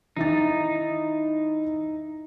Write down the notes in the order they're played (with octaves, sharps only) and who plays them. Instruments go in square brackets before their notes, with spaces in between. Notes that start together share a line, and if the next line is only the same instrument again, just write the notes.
[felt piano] D#3 E4 A6 [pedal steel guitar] D#4